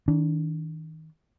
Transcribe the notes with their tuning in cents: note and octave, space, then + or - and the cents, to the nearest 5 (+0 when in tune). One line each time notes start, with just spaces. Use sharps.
D#3 +30 D4 -25